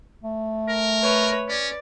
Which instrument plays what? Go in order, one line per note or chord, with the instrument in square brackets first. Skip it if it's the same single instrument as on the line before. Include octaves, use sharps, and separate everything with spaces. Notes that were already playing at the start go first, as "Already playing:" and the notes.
[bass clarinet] A3
[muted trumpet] A#4
[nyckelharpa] B4 C#5
[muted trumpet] C#4 [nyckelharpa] D5